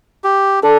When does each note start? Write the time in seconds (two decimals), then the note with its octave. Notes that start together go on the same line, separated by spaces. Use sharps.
0.24 G4
0.63 D4 A4